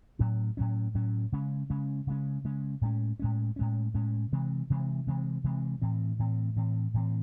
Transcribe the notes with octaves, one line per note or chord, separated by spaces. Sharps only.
A2 F#3 C#4
A2 F#3 C#4
A2 F#3 C#4
C#3 G#3 C#4
C#3 G#3 C#4
C#3 G#3 C#4
C#3 G#3 C#4
A2 G#3 C#4
A2 G#3 C#4
A2 G#3 C#4
A2 G#3 C#4
C3 E3 G#3 C4
C3 E3 G#3 C4
C3 E3 G#3 C4
C3 E3 G#3 C4
A2 E3 C4
A2 E3 C4
A2 E3 C4
A2 E3 C4